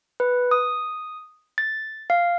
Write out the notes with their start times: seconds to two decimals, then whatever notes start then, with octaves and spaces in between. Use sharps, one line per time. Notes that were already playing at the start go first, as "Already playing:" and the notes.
0.20 B4
0.51 D#6
1.58 A6
2.10 F5